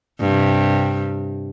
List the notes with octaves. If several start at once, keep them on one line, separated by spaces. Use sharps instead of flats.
G2 C3